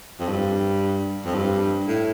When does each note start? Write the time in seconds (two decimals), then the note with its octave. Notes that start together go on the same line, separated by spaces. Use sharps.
0.20 F2
0.29 G2
1.25 F2
1.35 G2
1.88 A2